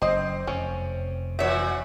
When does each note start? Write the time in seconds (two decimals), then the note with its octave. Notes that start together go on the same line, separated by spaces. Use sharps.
0.02 F#1 C4 C5 D#5
0.47 F1 F2 C3 C#4
1.39 A#2 E3 F#4 C#5 E5